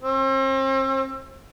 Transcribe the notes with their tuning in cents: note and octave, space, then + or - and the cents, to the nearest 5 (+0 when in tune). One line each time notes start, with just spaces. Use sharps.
C4 +40